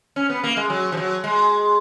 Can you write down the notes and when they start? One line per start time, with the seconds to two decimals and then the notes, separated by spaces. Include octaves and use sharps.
0.16 C#4
0.30 B3
0.44 A#3
0.57 G#3
0.70 F#3
0.92 F3
0.97 F#3
1.24 G#3